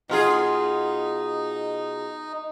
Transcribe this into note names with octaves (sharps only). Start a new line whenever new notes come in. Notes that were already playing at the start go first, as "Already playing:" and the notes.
B2 D#4 F4 G#4